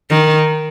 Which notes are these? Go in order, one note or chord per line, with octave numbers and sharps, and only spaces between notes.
D#3